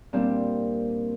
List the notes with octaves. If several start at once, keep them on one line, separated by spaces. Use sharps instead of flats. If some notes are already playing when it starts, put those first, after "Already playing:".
A#2 G3 C4 D4